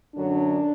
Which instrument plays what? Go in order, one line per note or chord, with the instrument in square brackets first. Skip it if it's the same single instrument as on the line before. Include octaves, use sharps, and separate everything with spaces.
[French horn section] F#2 D3 F#3 D4